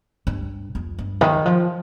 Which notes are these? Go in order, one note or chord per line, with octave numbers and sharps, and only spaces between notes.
G2
F2
G2
D#3
F3